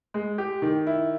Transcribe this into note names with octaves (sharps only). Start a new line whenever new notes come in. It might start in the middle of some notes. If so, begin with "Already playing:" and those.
G#3
G4
D#3
E4